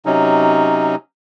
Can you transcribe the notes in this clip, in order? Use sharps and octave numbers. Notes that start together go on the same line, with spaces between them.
C3 F#3 C#4 D#4